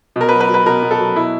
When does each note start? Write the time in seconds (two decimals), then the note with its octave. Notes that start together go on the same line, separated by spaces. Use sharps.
0.16 B2 A#4
0.29 B4
0.33 F#3
0.40 B4
0.49 F#3
0.54 B4
0.66 B2 A#4
0.82 B2
0.91 A4
1.00 F#3
1.16 B2 E4